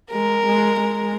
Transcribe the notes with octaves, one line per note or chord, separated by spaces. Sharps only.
G#3 A#4
G#3
G#3